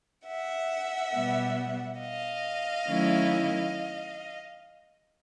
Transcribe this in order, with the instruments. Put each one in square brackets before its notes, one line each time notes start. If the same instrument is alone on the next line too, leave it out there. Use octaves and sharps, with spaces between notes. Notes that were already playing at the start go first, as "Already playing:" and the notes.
[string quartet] E5 F#5
B2 G3 B3
D#5 F5
D#3 F#3 A3 C#4 E4